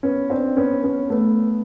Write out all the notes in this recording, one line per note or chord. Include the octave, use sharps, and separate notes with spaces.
B3 C#4
C4 D4
B3 C#4
B3 C#4
A3 B3